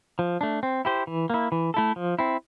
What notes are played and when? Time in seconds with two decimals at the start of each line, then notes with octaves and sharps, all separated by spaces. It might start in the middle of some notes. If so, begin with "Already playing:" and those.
0.19 F3
0.41 A3 D4
0.63 C4
0.85 E4 G4 C5
1.07 E3
1.30 A#3 E4
1.52 E3
1.74 A3 E4 A4
1.96 F3
2.19 C4 E4